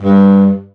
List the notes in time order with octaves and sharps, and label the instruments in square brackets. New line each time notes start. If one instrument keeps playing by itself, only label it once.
[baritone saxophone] G2